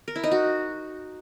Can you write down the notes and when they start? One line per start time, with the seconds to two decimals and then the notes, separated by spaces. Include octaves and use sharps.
0.08 A#4
0.16 E4
0.24 D#4
0.31 F#4